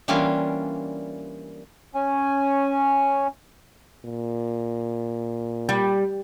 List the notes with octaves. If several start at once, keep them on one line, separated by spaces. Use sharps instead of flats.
E3 G3 A#3 C#4 D4 F4
C#4 G#5
A#2
G3